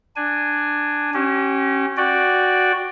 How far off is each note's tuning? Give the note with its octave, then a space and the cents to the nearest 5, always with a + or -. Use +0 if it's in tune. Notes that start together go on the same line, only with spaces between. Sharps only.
D4 +10 G#5 +0
C#4 -20 G4 -40
F#4 +0 D5 +0 G5 +0